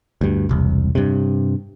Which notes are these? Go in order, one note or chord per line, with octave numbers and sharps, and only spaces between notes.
D2 G2
E1 C2
G2 C3